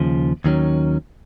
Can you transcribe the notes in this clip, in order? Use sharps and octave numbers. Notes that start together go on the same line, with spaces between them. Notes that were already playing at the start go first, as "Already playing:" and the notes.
Already playing: D#2 C#3 F3
D#2 D#3 F#3 C#4